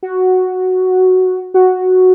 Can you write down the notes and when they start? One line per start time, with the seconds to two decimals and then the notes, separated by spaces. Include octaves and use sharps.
0.03 F#4
1.54 F#4